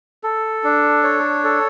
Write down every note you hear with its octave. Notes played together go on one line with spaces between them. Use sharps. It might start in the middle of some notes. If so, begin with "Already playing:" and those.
A4
D4
C#5
A4